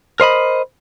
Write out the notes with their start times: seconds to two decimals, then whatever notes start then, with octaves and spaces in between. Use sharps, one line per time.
0.20 A#4 C5 D#5 B5